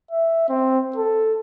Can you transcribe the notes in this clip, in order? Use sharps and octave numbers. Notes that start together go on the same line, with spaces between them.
E5
C4
A4